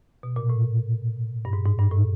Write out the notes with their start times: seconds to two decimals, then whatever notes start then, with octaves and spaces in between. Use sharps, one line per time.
0.23 B2
0.36 A#2
0.50 A2
1.45 G2
1.53 G#2
1.65 G#2
1.79 G2
1.92 A2